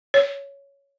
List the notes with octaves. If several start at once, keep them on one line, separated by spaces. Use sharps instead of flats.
C#5